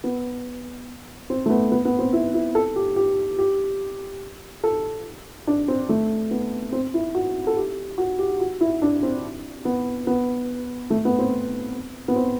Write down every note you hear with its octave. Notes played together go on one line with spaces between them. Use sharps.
B3
C4
A3
B3
B3
B3
C4
E4
E4
A4
G4
G4
G4
A4
D4
C4
A3
B3
C4
E4
F#4
A4
G4
F#4
G4
F#4
E4
D4
C4
B3
B3
A3
B3
C4
B3
C4